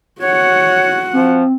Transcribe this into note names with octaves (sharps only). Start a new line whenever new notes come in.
F#4 C#5 F#5
F3 C4